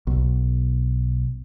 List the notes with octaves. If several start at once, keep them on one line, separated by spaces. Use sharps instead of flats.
B1